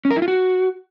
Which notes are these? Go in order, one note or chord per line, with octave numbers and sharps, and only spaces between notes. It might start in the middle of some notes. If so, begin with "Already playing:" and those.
C#4
A#4
E4
F4
F#4